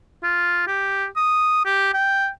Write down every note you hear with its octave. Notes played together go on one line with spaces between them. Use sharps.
F4
G4
D#6
G4
G5